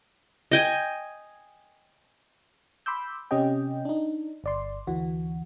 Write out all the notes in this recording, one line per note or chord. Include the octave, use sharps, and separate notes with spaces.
D#5 G5 G#5
B5 C6 D6 E6 G6
C3 C#4 G4 D#5 G5
D4 D#4
G1 D5 C6
D2 E3 F#4